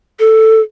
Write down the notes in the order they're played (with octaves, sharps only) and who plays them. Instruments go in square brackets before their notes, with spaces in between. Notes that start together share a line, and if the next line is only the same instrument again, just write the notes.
[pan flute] A4